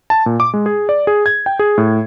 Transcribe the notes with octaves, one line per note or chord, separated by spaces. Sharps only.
A5
A#2
D6
G#3
G#4
D5
G#4
G#6
G5
G#4
A2